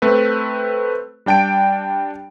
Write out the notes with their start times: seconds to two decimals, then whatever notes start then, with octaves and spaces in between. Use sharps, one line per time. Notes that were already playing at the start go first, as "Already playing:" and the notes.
0.02 A3 C4 B4
1.26 G3 D4 G5 A5 D7